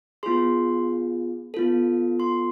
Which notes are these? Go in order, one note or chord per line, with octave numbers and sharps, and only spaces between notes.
B3 F4 G#4 C6
B3 F4 A4
C6